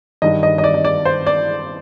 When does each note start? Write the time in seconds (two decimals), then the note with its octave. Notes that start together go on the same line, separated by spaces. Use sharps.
0.22 G2 D#3 D#5
0.43 D#5
0.58 D#5
0.64 D5
0.74 D#5
0.85 D5
1.05 C5
1.26 D5